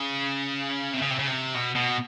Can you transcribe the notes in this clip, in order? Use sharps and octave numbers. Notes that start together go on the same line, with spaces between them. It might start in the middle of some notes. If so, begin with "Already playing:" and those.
Already playing: C#3
C3
C#3
C3
C#3
C3
B2
B2